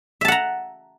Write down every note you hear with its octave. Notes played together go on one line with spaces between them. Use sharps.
E5 F#5 A5 A#5